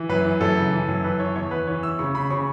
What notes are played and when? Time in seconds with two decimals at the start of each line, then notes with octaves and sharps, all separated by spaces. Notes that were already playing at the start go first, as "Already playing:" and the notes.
Already playing: E3
0.09 F#2 B4
0.25 E3
0.41 F#2 A4
0.57 C#3
0.73 E3
0.88 F#2
1.04 E3 B4
1.20 E3 C#5
1.35 E2 C#5
1.51 E2 B4
1.67 E3 C#5
1.83 E3 E6
1.99 C#3 C#6
2.14 C#3 B5
2.30 C#3 C#6